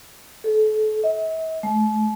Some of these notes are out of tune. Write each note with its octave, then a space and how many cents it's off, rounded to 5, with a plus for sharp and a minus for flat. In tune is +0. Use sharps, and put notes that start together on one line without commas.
A4 -35
E5 -45
A3 -40